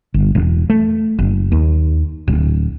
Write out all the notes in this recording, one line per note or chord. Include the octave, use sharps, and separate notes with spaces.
G1
E1
A3
F#1
D#2
D1